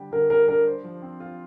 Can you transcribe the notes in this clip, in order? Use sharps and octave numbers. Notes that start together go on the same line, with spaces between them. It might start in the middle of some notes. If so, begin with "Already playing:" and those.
Already playing: D3 G3 D4 G4
D3 A#4
G3 A#4
D4 A#4
C5
F3
C4
F4